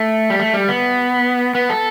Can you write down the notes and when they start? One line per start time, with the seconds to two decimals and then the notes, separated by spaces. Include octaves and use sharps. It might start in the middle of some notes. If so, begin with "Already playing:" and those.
Already playing: A3
0.30 G3
0.39 A3
0.54 G3
0.68 B3
1.55 B3
1.69 A4